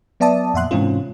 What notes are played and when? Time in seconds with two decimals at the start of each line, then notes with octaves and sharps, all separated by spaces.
0.20 F#3 B3 D5 E5 A5 D#6
0.54 F2 A#2 E5 F#5 C6 F#6
0.71 G#2 C3 E3 C4 C#4 F4